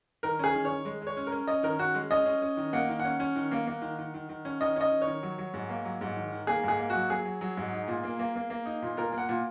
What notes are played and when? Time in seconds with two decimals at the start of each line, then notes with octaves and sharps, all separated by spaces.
0.23 D#3 A#4
0.39 C#4 G#4
0.54 D#3
0.65 C#5
0.70 D#3
0.85 G#3
1.01 G#3
1.07 C#5
1.17 C#4
1.27 A#4
1.32 C#4
1.47 C#4 D#5
1.63 D#3 A#4
1.79 C#4 F#4
1.94 G#3
2.10 C#4 D#5
2.26 C#4
2.42 C#4
2.57 D#3
2.73 A#3 F#5
2.89 D#3
3.00 F#5
3.05 C#4
3.20 C#4
3.36 D#3
3.51 A#3
3.67 A#3
3.82 D#3
3.98 D#3
4.14 D#3
4.29 D#3
4.45 C#4
4.60 D#3 D#5
4.76 C#4 D#5
4.91 D#3
5.02 C#5
5.07 D#3
5.23 F#3
5.38 F#3
5.54 G#2
5.69 A#3
5.85 F#3
6.01 G#2
6.16 D#3
6.32 D#3
6.47 A#3 G#4
6.63 G#2 G#4
6.79 A#3
6.90 F#3 F#4
7.10 F#3 G#4
7.25 F#3
7.41 F#3
7.57 G#2
7.73 D#4
7.88 A#2
8.04 A#3
8.19 A#3
8.35 A#3
8.50 A#3
8.66 D#4
8.82 A#2
8.97 A#2 A#4
9.12 A#3
9.18 F#5
9.29 A#2